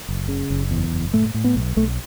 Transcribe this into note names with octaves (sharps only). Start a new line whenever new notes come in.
F#1
C#3
F#1
E2
F#1
A2 A3
A2
B3
B1
B1 A3